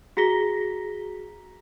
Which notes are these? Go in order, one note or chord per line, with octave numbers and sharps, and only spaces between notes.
F#4 G#4 A#5 A#6 B6 G7